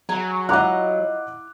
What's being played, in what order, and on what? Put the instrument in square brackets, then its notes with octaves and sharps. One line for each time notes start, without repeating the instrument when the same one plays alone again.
[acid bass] F#3 [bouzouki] G#4 G#5 [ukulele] A#5
[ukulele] E4 A#5 [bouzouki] F4 D#5 [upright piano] F#5 D6 F#6